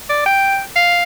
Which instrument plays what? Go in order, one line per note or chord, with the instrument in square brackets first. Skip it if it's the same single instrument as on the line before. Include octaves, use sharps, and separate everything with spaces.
[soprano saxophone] D5
G5
F5